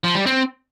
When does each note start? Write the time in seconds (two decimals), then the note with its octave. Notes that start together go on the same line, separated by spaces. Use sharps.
0.04 F3
0.15 G3
0.26 C4